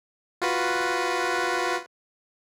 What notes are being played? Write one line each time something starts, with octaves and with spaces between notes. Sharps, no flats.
F4 F#4 B4